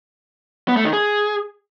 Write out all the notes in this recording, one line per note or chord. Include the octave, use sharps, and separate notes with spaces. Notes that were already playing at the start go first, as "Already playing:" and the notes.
B3
A3
D#3
G#4